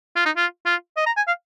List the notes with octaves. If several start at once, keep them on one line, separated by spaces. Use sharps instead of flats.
F4
D#4
F4
F4
D#5
A#5
G#5
F5